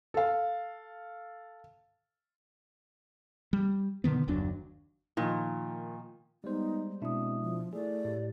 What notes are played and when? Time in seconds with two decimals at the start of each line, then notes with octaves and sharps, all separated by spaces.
0.14 A4 F5
3.53 G3
4.04 B2 D3 D#3 B3
4.28 F#1 D#2 F#3 D4
5.17 A#2 D#3 F3
6.44 G3 G#3 B3 D#4 C5
7.02 B2 G#3 C4 D4 E4 E5 D#6
7.41 F3
7.73 A3 E4 G#4 D5
8.05 A2 G4